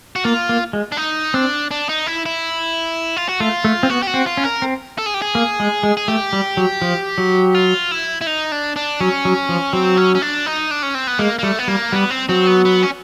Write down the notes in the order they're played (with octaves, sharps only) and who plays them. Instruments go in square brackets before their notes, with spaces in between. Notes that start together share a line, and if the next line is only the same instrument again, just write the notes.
[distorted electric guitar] F#4
[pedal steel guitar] A#3 [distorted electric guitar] F4
[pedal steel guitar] A#3
G#3
[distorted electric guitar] D4
D#4
[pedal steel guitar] C4 [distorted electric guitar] D4
[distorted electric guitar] D4
D#4
E4
E4
F4
F#4
[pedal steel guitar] A3 [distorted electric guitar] F4
[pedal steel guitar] A3
C4
[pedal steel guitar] B3 [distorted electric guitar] F#4
[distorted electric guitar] G4
F#4
[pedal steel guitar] C4
[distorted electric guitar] F4
[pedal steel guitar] C#4
[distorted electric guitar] A#4
[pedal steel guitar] C4
[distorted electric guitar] A4
G#4
G4
G#4
[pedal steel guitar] A#3
G#3
G#3
[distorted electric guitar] G#4
[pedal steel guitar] A3 [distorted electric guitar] G4
[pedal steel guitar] G3
F#3
F3
F#3
[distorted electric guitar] F4
E4
E4
D#4
D4
D4
[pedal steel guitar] F#3 [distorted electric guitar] C#4
[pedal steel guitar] F#3
F3
[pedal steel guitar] F#3 [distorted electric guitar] C4
[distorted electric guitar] C#4
C#4
D4
D#4
D4
C#4
C4
B3
[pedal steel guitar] G#3 [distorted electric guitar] A#3
[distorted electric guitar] A#3
[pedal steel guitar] G3 [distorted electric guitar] A3
[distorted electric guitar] B3
[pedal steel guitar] G3 [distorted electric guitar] A#3
[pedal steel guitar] G3 [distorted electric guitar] B3
[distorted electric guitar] C4
[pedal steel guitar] F#3 [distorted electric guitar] C4
[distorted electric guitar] B3
B3
C#4